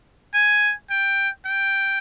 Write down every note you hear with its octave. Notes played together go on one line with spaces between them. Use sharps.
G#5
G5
G5